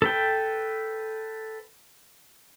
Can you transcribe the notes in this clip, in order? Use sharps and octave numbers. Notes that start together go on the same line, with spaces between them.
A4 B4 G5